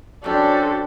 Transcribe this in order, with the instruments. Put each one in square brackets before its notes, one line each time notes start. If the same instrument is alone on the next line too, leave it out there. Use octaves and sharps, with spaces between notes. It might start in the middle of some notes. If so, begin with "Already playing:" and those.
[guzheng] F#3 C#4 [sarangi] D4 [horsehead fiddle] F#4 G4 [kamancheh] A4 C5